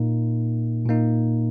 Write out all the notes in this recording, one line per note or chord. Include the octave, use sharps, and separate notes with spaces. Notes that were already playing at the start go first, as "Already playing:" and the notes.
Already playing: A#2 A#3 D#4
A#2 A#3 D#4